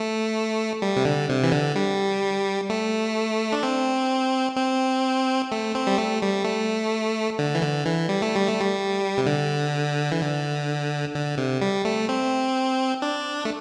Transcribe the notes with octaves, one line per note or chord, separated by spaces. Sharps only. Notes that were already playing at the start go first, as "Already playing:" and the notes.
Already playing: A3
G3
C3
D3
C3
E3
D3
G3
A3
D4
C4
C4
A3
C4
G3
A3
G3
A3
D3
E3
D3
E3
G3
A3
G3
A3
G3
C3
D3
E3
D3
D3
C3
G3
A3
C4
D4
A3